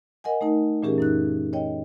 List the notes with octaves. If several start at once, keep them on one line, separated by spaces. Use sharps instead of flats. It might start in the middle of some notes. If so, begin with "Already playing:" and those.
A#4 D#5 F#5 G#5
A3 D#4 A#4
A#2 E3 C#4 G4 G#4 A#4
F#2 D#4 F#6
C#5 D#5 G5